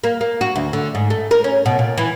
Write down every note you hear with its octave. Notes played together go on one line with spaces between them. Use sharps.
A#3
A#3
F#4
D2
D3
G#2
A3
A#4
C#4
B2
A#2
E3